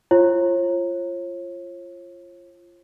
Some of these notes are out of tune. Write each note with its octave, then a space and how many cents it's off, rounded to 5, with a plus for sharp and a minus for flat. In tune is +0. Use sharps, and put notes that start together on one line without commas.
F4 -20 C#5 -45